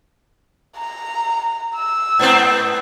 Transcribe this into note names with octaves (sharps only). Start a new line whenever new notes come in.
A#5
E6
G#2 B3 C4